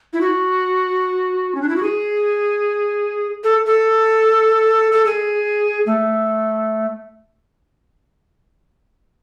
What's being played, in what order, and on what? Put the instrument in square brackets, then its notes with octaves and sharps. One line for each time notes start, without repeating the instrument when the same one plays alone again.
[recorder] E4
F#4
C#4
D4
E4
F#4
G#4
A4
A4
A4
G#4
A3